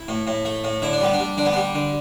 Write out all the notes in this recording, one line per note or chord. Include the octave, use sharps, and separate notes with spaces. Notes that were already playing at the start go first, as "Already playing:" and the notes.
Already playing: E4
A2
A2
A3
A2
D3 E4
D4
G3 B3
D4
G3
D3 D4
B3
G3 D4
D3